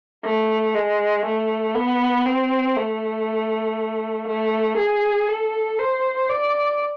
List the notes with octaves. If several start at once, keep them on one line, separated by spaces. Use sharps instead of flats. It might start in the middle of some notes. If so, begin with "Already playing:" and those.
A3
G#3
A3
B3
C4
A3
A3
G#4
A4
C5
D5